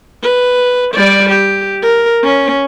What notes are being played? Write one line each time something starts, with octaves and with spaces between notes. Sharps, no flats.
B4
G3 D5
G4
A#4
C#4